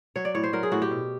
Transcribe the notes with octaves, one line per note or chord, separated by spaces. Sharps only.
F#3 C#5
D5
A2 C#5
C5
F#3 A#4
G#4
A2 F#4
G4
B2